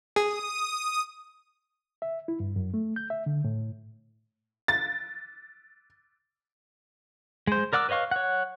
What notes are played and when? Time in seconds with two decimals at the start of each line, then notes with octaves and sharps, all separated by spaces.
0.16 G#4 D#6
2.02 E5
2.28 E4
2.40 G2
2.56 F#2
2.74 A3
2.96 G6
3.10 E5
3.26 D3
3.44 A2
4.68 A6
7.47 G#3 C5
7.73 A#4 D5 F#5 D6 E6
7.89 B4 C#5 D#5 F5 C#6
8.11 C#5 F#5